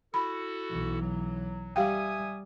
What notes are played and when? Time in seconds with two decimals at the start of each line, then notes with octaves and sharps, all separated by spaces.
0.14 E4 F#4 A4 B5
0.71 B1 E3
1.01 F#3
1.76 G3 G4 E5 F5 G5 G#5 D#6